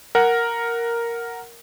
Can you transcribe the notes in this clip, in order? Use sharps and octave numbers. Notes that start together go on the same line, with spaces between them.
A#4 F#5